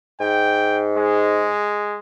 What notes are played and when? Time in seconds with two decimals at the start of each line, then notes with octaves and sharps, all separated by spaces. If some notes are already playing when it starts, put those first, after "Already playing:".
0.20 G#2 G5
0.96 G#3